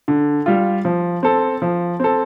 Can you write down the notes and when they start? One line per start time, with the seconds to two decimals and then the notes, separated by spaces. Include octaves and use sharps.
0.08 D3
0.46 G3 F4
0.85 F3
1.23 C4 A4
1.62 F3
2.00 C4 A4